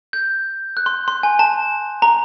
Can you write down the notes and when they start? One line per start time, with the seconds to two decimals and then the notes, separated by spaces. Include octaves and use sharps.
0.13 G6
0.77 F#6
0.86 C6
1.08 C6
1.23 G#5
1.39 A5
2.02 A#5